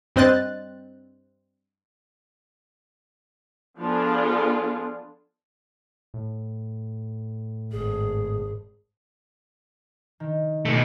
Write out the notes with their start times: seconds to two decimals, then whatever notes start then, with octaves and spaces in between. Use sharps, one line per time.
0.16 G2 C4 C5 D#5 F#6 A6
3.79 F3 B3 D4 F4 G#4 A4
6.14 A2
7.72 G#1 G#4
10.20 D#3
10.65 D#1 C#2 B2 A3 D5